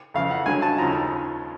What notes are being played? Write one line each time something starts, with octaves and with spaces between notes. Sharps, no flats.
F2 C#3 E3 F5
F#5
G2 D3 F#3 G#5
A5
D#2 C#3 F3 A#5